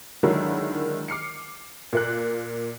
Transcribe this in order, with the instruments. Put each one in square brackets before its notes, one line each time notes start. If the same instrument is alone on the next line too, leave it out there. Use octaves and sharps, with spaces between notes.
[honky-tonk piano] D3 D#3 F#3 G#3 A#3 E4
D6 F6 C7 C#7
A#2 A#3 F#6